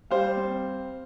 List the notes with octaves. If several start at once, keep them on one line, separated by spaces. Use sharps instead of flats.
G3 C5 F5
C4